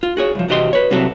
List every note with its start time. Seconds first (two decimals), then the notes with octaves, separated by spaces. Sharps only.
0.03 F4
0.17 F#4 G#4 C#5
0.35 C2 F3
0.49 E2 C3 F#4 G4 D#5 C6
0.73 B4 C#5
0.90 C2 C3 F#3 F#4 A4